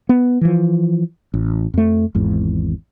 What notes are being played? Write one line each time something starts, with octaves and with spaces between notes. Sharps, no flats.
B3
E3 F3
A1
F2 A3
G#1 E2 G#2